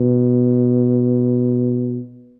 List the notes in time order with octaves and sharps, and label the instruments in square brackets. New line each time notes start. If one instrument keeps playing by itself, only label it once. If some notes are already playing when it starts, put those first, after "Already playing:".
Already playing: [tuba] B2